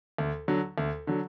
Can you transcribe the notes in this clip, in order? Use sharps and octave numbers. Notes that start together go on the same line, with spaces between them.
D2
D3 F#3
D2
D3 F#3